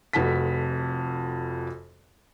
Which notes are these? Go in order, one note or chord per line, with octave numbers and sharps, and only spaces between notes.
F1 F2 F#4 A5 B6